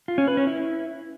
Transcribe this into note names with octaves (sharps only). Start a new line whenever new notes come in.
F4
C#4
B4
C#4
E4